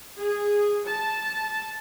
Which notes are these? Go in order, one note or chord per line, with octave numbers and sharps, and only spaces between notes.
G#4
A5